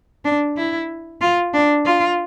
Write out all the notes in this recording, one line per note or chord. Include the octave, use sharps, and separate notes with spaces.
D4
E4
F4
D4
F4